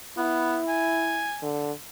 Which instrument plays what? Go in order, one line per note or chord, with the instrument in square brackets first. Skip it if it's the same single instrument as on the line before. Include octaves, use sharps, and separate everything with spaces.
[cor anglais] B3 [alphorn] E4
[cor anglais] G#5
[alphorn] D3